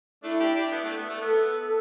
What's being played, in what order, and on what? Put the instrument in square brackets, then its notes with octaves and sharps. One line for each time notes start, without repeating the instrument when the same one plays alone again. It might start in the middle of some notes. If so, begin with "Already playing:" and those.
[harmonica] A3 D4 [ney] E4
[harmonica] D4 G4
D4 G4
B3 E4
A3 D4
B3
A3
[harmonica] B3 [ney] A4